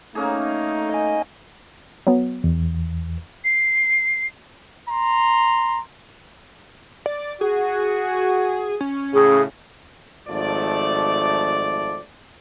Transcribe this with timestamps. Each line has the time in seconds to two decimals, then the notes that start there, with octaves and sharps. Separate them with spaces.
0.15 A3 A#3 C#4 D#4 G#4
0.90 D#5 G#5
2.07 F#3 B3
2.44 E2
3.44 C7
4.89 A#5 C6
7.06 D5
7.41 F#4 G#4
8.81 C#4
9.14 A2 C#3 G#4
10.28 G#1 F3 A3 D5